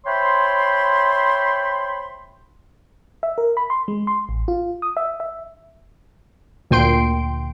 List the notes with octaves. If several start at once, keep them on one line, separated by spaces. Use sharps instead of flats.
C5 C#5 E5 G5 B5 C6
E5
A#4
B5
C6
G#3
C6
A1
F4
D#6
E5
E5
D2 A#2 G5 C6 D7